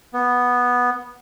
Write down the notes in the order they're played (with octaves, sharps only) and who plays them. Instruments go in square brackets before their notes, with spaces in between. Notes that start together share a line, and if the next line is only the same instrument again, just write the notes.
[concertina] B3